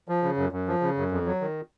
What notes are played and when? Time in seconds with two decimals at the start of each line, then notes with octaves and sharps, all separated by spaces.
0.08 F3
0.23 C#3
0.37 F#2
0.52 F#2
0.68 F3
0.82 C#3
0.97 F#2
1.12 F2
1.26 F#3
1.41 D#3